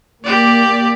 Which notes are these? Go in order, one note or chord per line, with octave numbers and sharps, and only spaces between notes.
A#3 G4 D5